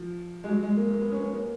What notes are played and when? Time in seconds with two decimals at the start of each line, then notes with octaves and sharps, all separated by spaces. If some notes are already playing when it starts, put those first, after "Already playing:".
Already playing: F3
0.44 G#3
0.48 F#3
0.63 G#3
0.77 A#3
0.91 A#3
1.01 B3
1.12 C#4
1.22 C#4
1.33 A#3